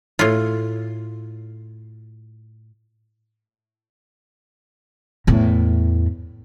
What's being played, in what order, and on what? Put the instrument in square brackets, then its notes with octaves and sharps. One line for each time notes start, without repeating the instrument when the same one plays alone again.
[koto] A2 F4
[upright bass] E2 A2